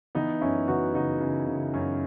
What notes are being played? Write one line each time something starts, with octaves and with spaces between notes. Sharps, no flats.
E3 B3 D#4
F#2 C#4 E4
E3 D#4 F#4
C#3 D#4 F#4
C#3
C#3
F#2 C#4